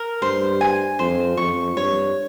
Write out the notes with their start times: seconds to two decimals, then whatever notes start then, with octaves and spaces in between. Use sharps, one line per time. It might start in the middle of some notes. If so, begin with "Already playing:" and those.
Already playing: A#4
0.22 G2 C5
0.61 G#5
0.99 F2 C5
1.37 F2 C#6
1.76 G2 C#5